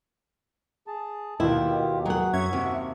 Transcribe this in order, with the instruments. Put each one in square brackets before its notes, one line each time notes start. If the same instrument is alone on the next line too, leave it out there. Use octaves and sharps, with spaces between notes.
[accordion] G#4 A5
[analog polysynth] D#2 B2 D#3 [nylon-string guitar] E4 [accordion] F4 G4
[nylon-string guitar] F#3 F#5 [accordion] G#4
[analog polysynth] F#2 C#4 G#6 [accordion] F#4 E5 C#6
[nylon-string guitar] D#2 [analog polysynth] C3